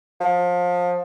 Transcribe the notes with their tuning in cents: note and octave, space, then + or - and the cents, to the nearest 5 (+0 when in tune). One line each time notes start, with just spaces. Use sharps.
F3 +25